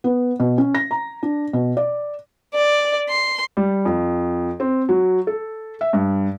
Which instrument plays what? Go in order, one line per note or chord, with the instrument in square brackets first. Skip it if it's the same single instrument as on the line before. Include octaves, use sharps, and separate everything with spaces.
[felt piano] B3
B2
C#4
A#6
A#5
D4
B2
D5
[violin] D5
C6
[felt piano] G3
F2
C4
F#3
A4
E5
G2